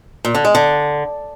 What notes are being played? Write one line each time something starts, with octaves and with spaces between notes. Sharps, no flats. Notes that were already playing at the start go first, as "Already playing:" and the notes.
A#2
D3
G#3
D3